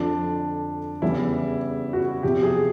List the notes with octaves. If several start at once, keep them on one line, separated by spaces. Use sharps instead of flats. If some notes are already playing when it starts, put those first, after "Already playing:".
Already playing: F2 D3 F3 D4
E2 C#3 E3 G3 E4
F#4
E2 C3 F3 G4
G#4